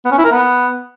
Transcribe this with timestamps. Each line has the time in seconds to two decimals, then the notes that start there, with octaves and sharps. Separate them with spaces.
0.05 B3
0.12 C#4
0.18 E4
0.25 A#4
0.31 B3